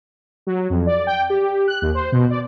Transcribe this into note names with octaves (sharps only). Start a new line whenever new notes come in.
F#3
F2
D5
G5
G4
F#6
D#2
C5
B2
D5